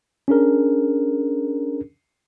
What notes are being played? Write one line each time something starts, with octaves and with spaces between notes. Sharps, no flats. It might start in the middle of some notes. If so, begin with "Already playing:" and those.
C#4 D4 G#4 A#4